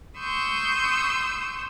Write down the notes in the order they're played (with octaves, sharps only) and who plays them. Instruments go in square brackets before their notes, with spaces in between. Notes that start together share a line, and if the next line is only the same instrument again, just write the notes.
[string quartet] C6 C#6 D#6 E6 G6